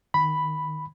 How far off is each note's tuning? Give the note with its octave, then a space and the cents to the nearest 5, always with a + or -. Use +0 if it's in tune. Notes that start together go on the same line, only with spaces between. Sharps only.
D#3 -15 B5 +0